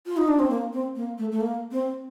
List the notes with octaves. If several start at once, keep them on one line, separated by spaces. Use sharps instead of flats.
F4
D#4
D4
C4
A#3
C4
A#3
A3
A3
A#3
C4